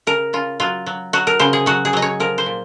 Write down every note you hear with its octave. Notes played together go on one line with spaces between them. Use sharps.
C#3 A#4
C#3 F4
F#3 F4
F#3
F#3 F#4
A#4
C#3 C5
G#4
F#3 F#4
G#4
F#3 D#5
C#5
F3 A#4
C5
A#2